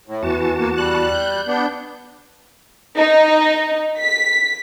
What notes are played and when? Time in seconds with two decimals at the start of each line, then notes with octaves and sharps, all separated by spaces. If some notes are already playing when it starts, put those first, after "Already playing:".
0.07 A2
0.23 E2 E3 F#4 A5
0.59 A#3
0.77 G3 F#6
1.14 G6
1.47 B3 D4
2.98 D#4
4.01 B6